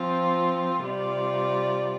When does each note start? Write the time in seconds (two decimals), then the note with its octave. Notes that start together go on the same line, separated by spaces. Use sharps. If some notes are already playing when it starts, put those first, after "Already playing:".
Already playing: F3 C4 F4
0.85 C3 G3 F4 D5